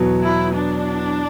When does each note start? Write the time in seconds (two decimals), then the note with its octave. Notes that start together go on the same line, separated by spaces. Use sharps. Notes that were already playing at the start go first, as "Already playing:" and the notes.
Already playing: E2 B2 F#3
0.23 E4
0.55 D4